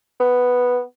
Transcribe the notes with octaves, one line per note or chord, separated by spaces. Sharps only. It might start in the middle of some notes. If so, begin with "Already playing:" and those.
B3